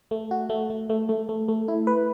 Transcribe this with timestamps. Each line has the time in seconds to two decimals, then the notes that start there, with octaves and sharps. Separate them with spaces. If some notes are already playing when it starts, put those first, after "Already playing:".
0.11 A3
0.31 F#4
0.49 A3
0.70 A3
0.90 A3
1.09 A3
1.29 A3
1.48 A3
1.68 E4
1.87 B4